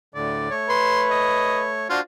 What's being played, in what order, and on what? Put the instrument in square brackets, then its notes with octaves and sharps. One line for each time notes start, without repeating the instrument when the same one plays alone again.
[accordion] D2 A2 D3 [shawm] D5
[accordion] A3 C#5
[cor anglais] B4 [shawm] C6
[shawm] D#5
[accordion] D4 F#4 C5 [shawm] F4